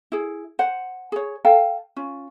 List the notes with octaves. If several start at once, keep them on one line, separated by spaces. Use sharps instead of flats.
E4 G#4
C5 F#5
G#4 C#5
A4 F5 G5 A5
C#4 F4